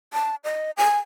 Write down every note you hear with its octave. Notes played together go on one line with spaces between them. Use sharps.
A5
D#5
G#5